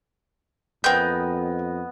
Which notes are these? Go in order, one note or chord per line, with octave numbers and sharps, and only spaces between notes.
F2 C#3 B3 C4 A#4 D#5 G5 G6